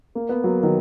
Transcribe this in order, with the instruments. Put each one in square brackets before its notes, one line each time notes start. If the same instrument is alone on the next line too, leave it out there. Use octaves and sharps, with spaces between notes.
[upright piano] A#3
B3
F#3 A#3
D#3 F#3